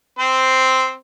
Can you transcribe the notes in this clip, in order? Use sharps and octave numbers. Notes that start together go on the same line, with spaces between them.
C4 C5